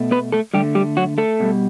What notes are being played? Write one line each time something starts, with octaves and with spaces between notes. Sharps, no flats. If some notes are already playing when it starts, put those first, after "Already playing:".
Already playing: B2 A3
B3 B4
A3 A4
D3 G3 A3 G4
G3 G4
F#3 F#4
A3 A4
B2 G3